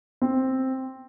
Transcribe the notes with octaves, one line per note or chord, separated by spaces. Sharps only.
C4